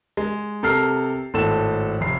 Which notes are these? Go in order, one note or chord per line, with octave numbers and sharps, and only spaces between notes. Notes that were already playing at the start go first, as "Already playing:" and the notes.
G#3
C3 A4 A#4 F6 C7
G#1 A2 A4 E7
F1 C7